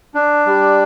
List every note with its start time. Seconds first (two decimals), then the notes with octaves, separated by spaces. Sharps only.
0.15 D4
0.46 G3